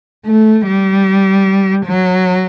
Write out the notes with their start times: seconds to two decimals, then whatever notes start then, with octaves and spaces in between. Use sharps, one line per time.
0.26 A3
0.66 G3
1.86 F#3